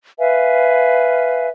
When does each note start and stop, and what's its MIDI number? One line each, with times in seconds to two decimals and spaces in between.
0.19 1.48 71
0.19 1.48 76
0.19 1.48 77
0.19 1.48 80